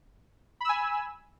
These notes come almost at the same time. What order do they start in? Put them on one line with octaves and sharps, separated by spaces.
B5 E6 G#5